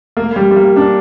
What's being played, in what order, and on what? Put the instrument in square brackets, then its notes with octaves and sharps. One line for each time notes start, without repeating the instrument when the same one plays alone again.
[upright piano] A#3
G3
G3
A#3
D4